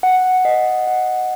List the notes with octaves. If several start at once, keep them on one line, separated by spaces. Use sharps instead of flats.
F#5
D#5
F#5